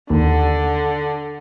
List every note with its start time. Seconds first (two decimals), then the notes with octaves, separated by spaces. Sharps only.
0.10 D#2 D3